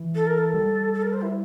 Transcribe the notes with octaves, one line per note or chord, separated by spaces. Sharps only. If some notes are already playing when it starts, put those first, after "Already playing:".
Already playing: E3
A4
A#4
A4
G3
A4
A#4
C5
E4